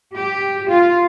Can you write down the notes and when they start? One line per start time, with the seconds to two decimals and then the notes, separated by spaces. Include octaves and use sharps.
0.16 G4
0.70 F4